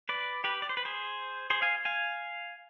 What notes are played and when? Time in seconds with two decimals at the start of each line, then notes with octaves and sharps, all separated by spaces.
0.09 B4 D5
0.44 G4 B4
0.62 D5
0.69 C5
0.77 B4
0.85 G#4 C5
1.50 G#4 C5
1.62 F5 G#5
1.85 F5 G#5